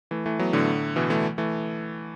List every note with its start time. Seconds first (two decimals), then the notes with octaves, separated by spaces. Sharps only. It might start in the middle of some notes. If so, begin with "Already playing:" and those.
0.11 E3 A3
0.26 E3 A3
0.39 F#3 B3
0.53 A2 D3
0.96 B2 E3
1.10 E3 A3
1.38 E3 A3